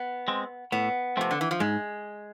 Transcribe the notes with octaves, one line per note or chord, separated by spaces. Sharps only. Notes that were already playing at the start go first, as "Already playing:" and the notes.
Already playing: B3
G#3 C4
A2 B3
C3 F3 A3 C4
D3
E3
F3
G#2 G#3